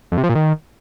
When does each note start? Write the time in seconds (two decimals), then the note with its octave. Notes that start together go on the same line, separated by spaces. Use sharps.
0.12 F2
0.18 C3
0.24 F3
0.29 A#2
0.35 D#3